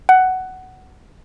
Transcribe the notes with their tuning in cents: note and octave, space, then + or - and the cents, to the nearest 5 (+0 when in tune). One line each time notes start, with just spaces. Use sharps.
F#5 +10